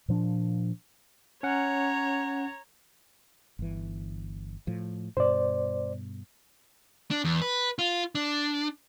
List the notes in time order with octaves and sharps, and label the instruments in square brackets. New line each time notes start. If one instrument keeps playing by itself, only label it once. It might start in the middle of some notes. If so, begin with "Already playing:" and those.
[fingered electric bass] A#2 F3 D4
[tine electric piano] C#4 F#5 [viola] C#5 A#5
[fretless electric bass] G1 E3
A2 F3
[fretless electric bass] G2 B2 [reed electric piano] C5 D5
[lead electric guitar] D4
E2
B4
F4
D4